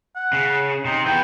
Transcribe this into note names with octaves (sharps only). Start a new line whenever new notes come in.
F#5
C#3
C3 D#4
E3 B3 G5